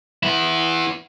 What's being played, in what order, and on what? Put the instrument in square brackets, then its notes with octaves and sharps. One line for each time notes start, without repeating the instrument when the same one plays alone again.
[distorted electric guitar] B3 E4